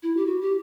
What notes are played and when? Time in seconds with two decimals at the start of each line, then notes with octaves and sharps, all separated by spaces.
0.03 E4
0.17 G4
0.26 F#4
0.41 G4